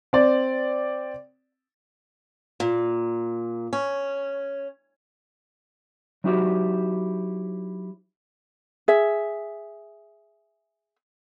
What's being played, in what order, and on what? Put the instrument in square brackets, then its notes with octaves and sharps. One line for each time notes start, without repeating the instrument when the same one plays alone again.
[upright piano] C4 D5
[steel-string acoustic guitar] A#2
C#4
[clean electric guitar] F#3 D#4 E4 F#4 G4 C5
[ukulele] G#4 E5